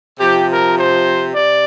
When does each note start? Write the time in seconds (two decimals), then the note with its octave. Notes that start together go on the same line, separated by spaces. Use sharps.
0.20 C3 F3 G4
0.49 A#4
0.77 C5
1.34 C3 D5